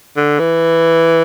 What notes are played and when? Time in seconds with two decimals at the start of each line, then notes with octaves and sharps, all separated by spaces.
0.16 D3
0.39 E3